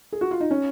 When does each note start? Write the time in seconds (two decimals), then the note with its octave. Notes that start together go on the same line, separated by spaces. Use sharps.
0.12 G#4
0.21 F#4
0.31 F4
0.40 D#4
0.51 C#4